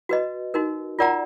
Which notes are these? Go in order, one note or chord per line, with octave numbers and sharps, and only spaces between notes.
F#4 B4 D#5
D#4 F#4 A#4
F4 A#4 D5 F#5 A#5